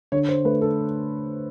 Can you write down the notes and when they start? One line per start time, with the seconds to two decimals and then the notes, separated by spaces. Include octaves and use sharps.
0.12 D3 C#5
0.29 C5
0.45 A3 B4
0.62 A4